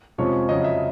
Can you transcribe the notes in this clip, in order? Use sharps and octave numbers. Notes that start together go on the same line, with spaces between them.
F2 C3 F3 G#3 C#4 C#5
F2 C#3 F#3 D#5
E5